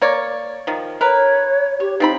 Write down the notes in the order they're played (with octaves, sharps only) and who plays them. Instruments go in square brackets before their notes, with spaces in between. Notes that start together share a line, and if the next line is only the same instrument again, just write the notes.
[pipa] A#3 C#5 D5
D#3 F3
[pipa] A#4 B4 [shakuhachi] C#5
[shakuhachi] G4 [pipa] C#5
[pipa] F3 C4 B5 [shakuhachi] D#4